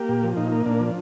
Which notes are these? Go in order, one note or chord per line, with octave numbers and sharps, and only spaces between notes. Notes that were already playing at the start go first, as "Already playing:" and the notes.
Already playing: A#3 G4
A#2
F3
A#2 D#4
A#3
A#2 D4
F3